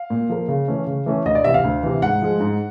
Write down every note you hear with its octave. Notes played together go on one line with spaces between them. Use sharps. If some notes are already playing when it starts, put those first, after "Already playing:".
Already playing: F5
A#2
F3 A#3
C#3
E3 A3 C#4
C#3
E3 A3 C#4
D2 D#5
D5
C3 E3 E5
F5
D2
C3 E3
G#2 F#5
F3 G#3
G#2